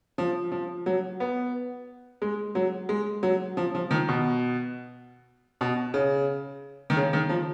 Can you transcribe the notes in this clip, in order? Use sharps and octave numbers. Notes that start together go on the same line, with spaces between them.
F3
F3
F#3
B3
G#3
F#3
G#3
F#3
F3
F3
D#3
B2
B2
C#3
D#3
C#3
D#3
F3